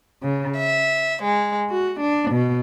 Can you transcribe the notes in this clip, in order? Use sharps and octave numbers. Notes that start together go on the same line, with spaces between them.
C#3
E5
G#3
F#4
D4
B2